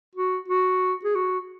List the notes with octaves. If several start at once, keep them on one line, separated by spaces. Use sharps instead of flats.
F#4
F#4
G#4
F#4